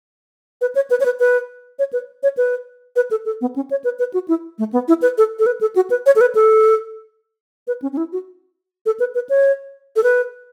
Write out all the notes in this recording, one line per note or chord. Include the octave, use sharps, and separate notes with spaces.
B4
C#5
B4
C#5
B4
B4
C#5
B4
C#5
B4
B4
A4
A4
B3
C#4
C#5
B4
B4
F#4
E4
A3
B3
E4
B4
A4
A4
B4
A4
F#4
B4
C#5
A4
B4
A4
B4
C#4
C#4
E4
F#4
A4
B4
B4
C#5
A4
B4